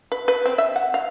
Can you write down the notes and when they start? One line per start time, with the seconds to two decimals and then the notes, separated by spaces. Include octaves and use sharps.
0.12 B4
0.28 B4
0.46 C4
0.58 E5
0.76 F#5
0.94 F5